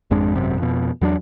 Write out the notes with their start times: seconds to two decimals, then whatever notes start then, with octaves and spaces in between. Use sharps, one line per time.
0.11 G#1 F2 G#3 D4
0.35 G#1 F#2 C3
0.58 F2 B2
1.01 E2 F#3 B3 D4